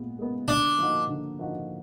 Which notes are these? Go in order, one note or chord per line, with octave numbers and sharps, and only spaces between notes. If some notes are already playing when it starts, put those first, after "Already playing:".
Already playing: A#2 G#3 B3
G#3 B3
D3 D4
F3 A#3 D#4 F#4
D3
F3 A#3 D#4 F#4